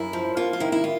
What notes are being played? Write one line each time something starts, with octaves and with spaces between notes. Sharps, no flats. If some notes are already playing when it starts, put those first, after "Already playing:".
Already playing: F#2 E4
F3
A#3 F4
F4
D#3 E4
E4
F4